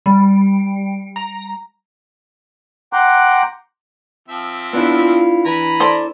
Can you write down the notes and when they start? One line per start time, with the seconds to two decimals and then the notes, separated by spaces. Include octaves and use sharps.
0.06 G3
1.16 A#5
2.93 F#5 G5 A#5 C6 D6 F#6
4.29 F3 C4 E5
4.73 B3 D4 E4 F4
4.96 F4
5.45 E3 G#5 A#5 B5
5.80 A4 C5 D5